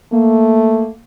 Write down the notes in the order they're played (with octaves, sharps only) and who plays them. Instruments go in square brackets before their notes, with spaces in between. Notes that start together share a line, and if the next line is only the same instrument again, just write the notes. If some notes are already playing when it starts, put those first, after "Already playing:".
[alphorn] A3 [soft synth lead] A#3